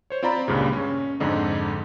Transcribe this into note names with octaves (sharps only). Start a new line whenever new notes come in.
C5 C#5
C4 F4 D5 A#5 B5
C#2 G2 A#2 C#3
C#4
F2 G#2 D3 D#4